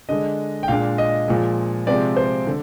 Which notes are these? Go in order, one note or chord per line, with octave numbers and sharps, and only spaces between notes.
D3 G#3 D4 D#5
G5
A#2 G#3 D4 F5
D#5
A#2 F3 G#3
C3 F3 G#3 C4 D5
C5
D3